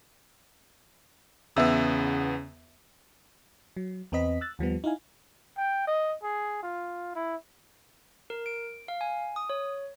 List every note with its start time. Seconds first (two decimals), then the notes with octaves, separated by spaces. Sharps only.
1.56 E2 C#3 B3 E5 E6
3.77 F#3
4.12 E2 C4 B4 D#5 B6
4.41 E6 F#6 A6
4.59 D#2 F3 G3 B3
4.84 D#4 E4 F5 G#5
5.57 G5
5.87 D#5
6.23 G#4
6.63 F4
7.15 E4
8.30 A#4
8.46 D7
8.88 F5
9.01 G#5
9.36 D#6
9.50 C#5